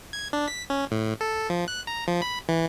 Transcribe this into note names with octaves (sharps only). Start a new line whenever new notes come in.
G#6
D4
B6
C#4
A2
A4
F3
F#6
A#5
F3
B5
E3